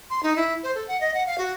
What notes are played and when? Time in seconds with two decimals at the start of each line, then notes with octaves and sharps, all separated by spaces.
0.10 C6
0.23 D#4
0.36 E4
0.63 C5
0.75 A4
0.88 F#5
1.01 D#5
1.14 F#5
1.26 F5
1.38 F#4